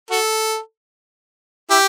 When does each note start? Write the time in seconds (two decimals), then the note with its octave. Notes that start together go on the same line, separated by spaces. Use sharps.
0.10 F#4 A4
1.70 E4 G4